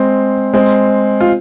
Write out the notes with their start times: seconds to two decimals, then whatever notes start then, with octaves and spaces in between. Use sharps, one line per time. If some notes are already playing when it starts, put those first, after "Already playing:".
Already playing: G#3 C4
0.53 G#3 C4
1.21 F4